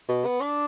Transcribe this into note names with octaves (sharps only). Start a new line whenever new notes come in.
B2
B3
D4